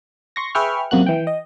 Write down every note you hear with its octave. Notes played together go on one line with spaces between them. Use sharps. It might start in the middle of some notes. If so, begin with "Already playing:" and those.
C6 C#6 A#6
G#4 B4 E5 G5 C#6 F6
F#2 C3 A#3 F#4 F#6
E3 G5
D#5